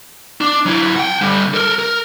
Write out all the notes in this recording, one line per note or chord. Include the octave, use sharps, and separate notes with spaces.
D4
F#3 E4
F#5 G5
D3 G3
A4 A#4
A#4